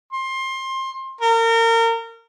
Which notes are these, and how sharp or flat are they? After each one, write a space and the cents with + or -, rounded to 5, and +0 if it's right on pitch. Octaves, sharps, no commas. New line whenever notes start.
C6 +20
A#4 -30